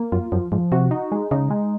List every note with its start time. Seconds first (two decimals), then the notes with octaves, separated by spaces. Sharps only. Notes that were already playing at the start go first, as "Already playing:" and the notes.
Already playing: A#3
0.12 F#2 F4
0.32 F#2 F3
0.52 G#2 F3
0.72 C3 F#4
0.91 D#4
1.12 G#3
1.31 C#3 D#4
1.50 G#3